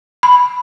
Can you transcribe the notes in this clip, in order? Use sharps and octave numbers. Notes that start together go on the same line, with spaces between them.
B5